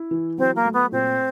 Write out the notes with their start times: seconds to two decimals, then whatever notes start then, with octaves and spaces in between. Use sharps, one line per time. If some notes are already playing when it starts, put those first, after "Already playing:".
Already playing: E4
0.11 E3
0.38 F#3 C4
0.56 A#3
0.65 A3
0.73 B3
0.92 A#2 C4